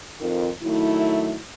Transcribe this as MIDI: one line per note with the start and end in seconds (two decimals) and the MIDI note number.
0.20 0.49 41
0.20 0.49 51
0.63 1.36 51
0.63 1.36 54
0.63 1.36 57
0.63 1.36 64